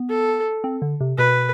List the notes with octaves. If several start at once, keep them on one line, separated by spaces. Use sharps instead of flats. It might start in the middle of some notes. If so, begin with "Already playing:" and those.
Already playing: B3
A4
C4
D3
C3
B2 B4